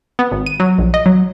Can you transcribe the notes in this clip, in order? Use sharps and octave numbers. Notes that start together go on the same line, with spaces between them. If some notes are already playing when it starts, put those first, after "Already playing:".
B3
G#1
D#7
F#3
A#1
D#5
F#3